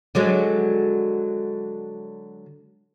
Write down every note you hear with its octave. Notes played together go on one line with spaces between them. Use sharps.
D3 F#3 G#3